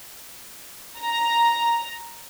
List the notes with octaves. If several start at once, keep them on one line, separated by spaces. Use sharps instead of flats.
A#5